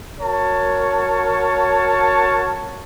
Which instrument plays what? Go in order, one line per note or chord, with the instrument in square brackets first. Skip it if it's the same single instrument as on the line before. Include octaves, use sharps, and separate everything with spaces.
[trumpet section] F#4 A#4 C#5 A5